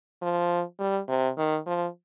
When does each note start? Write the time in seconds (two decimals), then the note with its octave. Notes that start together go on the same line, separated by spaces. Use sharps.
0.22 F3
0.79 G3
1.09 C3
1.38 D#3
1.67 F3